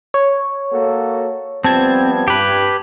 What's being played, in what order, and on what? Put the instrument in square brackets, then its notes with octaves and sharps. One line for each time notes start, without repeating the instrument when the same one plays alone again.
[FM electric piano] C#5
[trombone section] A#3 F#4 A4
[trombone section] F3 G3 B3 [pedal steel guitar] C4 [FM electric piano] A5 G#6
[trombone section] G2 [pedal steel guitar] G4 B4